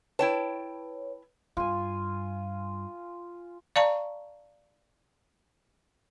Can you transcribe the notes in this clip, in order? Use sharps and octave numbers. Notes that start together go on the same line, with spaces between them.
E4 B4 C#5 G5 A5
G2 F4 G#5
D5 F5 A5 A#5 C#6